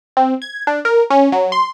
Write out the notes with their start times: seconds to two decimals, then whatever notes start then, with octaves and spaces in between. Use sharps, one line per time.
0.17 C4
0.42 G#6
0.67 D4
0.85 A#4
1.10 C#4
1.32 F#3
1.52 C6